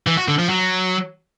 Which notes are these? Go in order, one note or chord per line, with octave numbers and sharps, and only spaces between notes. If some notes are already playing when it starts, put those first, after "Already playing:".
E3
F#4
D3
F3
F#3